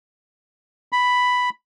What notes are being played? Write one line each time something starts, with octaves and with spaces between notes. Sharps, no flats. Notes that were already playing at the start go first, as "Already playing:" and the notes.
B5